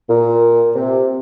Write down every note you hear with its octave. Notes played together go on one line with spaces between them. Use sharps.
A#2
C3